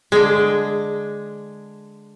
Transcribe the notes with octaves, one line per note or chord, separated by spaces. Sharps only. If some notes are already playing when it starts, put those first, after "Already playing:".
D3 G#3